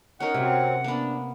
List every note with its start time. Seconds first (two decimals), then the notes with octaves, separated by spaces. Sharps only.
0.20 C#4 D#4 A#4 F#5
0.34 C3 F#3 C4
0.84 A#3 B3 D4